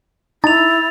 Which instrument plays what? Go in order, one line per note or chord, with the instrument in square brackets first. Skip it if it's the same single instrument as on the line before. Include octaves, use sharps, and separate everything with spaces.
[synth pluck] D#4 [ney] E4 [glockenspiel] A6 F7